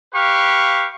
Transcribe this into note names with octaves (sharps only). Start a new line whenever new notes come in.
G4 B4 F5 C#6